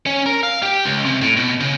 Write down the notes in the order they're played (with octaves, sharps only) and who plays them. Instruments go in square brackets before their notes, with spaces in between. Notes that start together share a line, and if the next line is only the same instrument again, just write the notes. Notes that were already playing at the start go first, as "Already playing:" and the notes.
[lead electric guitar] C#4
A#4
F5
G4
C#2
C3
A2
B2
C#3